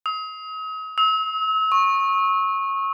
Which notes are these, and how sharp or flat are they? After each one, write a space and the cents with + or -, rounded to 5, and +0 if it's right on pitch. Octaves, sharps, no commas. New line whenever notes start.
D#6 +40
E6 -40
C#6 -20